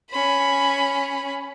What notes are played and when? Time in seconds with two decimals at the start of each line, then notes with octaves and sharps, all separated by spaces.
0.11 C#4 B5